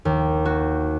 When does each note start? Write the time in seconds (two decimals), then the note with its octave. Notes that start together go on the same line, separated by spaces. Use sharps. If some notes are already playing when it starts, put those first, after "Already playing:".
0.05 D#2
0.45 F#4